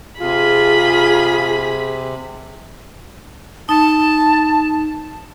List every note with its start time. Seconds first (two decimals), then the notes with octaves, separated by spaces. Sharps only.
0.20 C3 F4 G#4 B5
3.69 D#4 A5